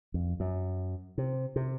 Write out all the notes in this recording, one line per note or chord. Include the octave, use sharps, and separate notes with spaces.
F2
F#2
C3
C3